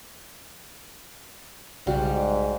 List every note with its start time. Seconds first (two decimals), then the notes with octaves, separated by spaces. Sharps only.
1.87 B1 G#2 C#3 G3 F#4 D5 F5 G5